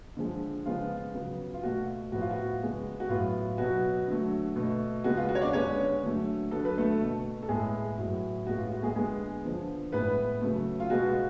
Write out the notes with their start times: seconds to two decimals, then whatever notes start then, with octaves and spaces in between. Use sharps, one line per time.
0.17 D3 F3 G#3
0.66 C#3 F3 G#3 B3 F4
1.14 C#3 F#3 B3
1.54 F4
1.63 B2 A3 F#4
2.12 A2 F3 B3 F#4
2.21 F4
2.31 F#4
2.61 C#3 G#3 B3
3.00 F#4
3.09 A2 F#3 B3 F4
3.58 B2 F#3 B3 F#4
4.08 D3 F#3 A3
4.56 B2 A3
5.04 C#3 G#3 B3 F#4
5.17 F4
5.29 F#4
5.35 C#5
5.42 D4 D5
5.53 D3 G#3 B3 C#4 C#5
6.03 D3 F#3 A3
6.51 D3 F#3 B3 A4
6.65 B4
6.78 A3 A4
7.00 B2 A3
7.43 A4
7.49 A2 G#3 B3 G#4
7.98 A2 F#3 B3
8.46 A2 G#3 B3 F#4
8.58 F4
8.71 F#4
8.83 G#3 G#4
8.96 D3 G#3 B3 G#4
9.44 D3 F3 B3
9.92 A2 G#3 B3 B4
10.41 C#3 F#3 A3
10.80 F4
10.90 B2 G#3 B3 F#4